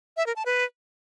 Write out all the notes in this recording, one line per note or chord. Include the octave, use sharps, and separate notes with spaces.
E5
A#4
A5
B4